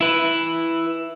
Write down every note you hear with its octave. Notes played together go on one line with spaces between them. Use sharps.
E4 B4